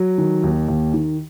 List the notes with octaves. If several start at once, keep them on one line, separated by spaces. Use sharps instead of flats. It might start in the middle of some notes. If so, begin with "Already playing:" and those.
Already playing: F#3
D#3
D#2
D#2
D#3